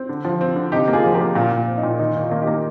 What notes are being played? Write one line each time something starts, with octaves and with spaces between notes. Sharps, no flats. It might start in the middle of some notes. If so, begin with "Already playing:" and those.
Already playing: C4
D3
F3
C4
D3
C3 D#4 G4
A#3
F4 G#4
F3
G4 A#4
A#3
A#2 F4
A#2
F4
C4
D#4
A#2
D#3 D#4
D#3
F4
A#3
D#4 G4
A#3